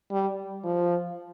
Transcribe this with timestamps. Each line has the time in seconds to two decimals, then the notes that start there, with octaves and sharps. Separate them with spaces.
0.11 G3
0.64 F3